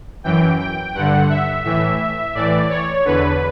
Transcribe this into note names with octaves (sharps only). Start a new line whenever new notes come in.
F#2 E3 G5
G5
G2 D3 F#5
E5
A2 E3 E5
A2 E3 D5
C#5
E2 D3 B4